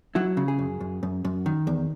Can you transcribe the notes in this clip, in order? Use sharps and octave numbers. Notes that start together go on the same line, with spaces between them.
F#3 E4
C#3
G#4
F#2
F#2
F#2
F#2
D#3
E2